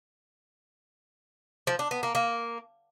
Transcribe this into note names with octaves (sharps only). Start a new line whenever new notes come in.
F3
D4
B3
A#3
A#3